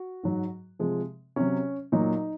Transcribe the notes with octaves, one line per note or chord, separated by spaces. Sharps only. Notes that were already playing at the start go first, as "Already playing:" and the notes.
Already playing: F#4
G#2 F#3
C3 F3 G#3
C3 F#3 C#4
A#2 F#3 D#4